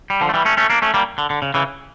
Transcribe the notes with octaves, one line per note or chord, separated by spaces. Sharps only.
G3
D3 F3
A3
E3 G3
A3 C#4
A3 C#4
A#3 D4
A3 C#4
G3 A#3
D3
D3
C#3
C#3 E3